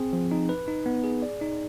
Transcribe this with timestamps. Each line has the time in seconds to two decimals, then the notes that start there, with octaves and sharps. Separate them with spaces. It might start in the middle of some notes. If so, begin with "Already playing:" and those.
Already playing: C4 G#4
0.13 F3
0.31 D#4
0.49 B4
0.68 D#4
0.86 B3
1.04 G#4
1.22 D5
1.41 D#4